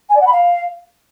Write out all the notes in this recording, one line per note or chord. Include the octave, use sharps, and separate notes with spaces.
G#5
D5
F#5
B5
F5